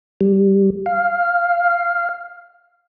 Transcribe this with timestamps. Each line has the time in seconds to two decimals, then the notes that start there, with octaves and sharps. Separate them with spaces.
0.21 G3
0.86 F5